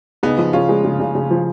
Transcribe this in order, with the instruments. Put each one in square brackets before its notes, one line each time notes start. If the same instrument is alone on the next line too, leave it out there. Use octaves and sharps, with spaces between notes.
[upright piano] C#3 [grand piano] B3 D#4
[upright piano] F3
[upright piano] C#3 [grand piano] C#4 F4
[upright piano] G#3
C#3
C#3
C#3
F3